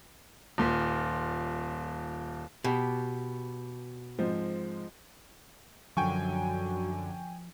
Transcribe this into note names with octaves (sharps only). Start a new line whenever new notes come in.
D#1 A#2
B2 G4
G#2 F3 C4
F#2 D3 F3 F#3 G5 G#5 C#6